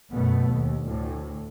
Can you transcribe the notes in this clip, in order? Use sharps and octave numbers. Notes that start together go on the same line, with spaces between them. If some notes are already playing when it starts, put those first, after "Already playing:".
F#2 B2 A3 B3
D#2
D2 A2